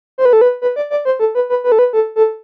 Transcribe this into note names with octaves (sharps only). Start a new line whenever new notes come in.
C5
B4
A4
B4
B4
D5
D5
C5
A4
B4
B4
B4
A4
B4
A4
A4